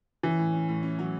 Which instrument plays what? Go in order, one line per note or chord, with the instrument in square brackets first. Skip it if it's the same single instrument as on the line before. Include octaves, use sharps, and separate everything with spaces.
[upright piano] E3 [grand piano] C#4
[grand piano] A2
C#4
A2
C#4
F#3